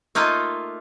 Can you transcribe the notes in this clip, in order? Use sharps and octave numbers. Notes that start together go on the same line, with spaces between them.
A3 A#3 D#4 F4